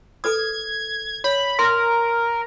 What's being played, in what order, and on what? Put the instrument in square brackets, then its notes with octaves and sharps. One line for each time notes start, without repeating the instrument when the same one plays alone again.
[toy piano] A4 B4 D#6 [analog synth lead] G#6
[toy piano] C#5 [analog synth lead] B5
[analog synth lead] A#4 [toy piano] C6